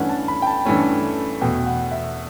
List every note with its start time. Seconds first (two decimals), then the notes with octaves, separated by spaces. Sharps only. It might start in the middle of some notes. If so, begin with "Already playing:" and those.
Already playing: G2 E3 A3 C#4 F#5
0.09 A5
0.28 B5
0.42 G5
0.47 A5
0.65 G2 E3 A3 C#4
1.41 E2 B2 A3 G5
1.67 F#5
1.91 E5